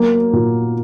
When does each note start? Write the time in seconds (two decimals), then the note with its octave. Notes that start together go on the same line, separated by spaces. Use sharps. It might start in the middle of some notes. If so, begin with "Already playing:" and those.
Already playing: F#3 A#3
0.33 A#2